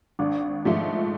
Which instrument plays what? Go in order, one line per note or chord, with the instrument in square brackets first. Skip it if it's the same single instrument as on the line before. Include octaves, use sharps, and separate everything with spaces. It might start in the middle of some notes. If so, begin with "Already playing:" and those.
[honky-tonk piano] G#1 [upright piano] D4
[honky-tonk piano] G#2 F3 A3